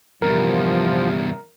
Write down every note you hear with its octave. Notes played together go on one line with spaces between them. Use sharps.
E2 G2 C3 F3 A#4